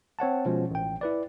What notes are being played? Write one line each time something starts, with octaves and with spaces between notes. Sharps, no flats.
C4 C#5 F#5 A5
B2 F3 G#3 C#4
A1 G5
E4 B4 D5